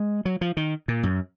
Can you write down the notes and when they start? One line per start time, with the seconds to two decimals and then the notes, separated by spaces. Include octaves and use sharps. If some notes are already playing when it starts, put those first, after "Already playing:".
Already playing: G#3
0.25 F#3
0.41 F3
0.57 D#3
0.88 A#2
1.03 F#2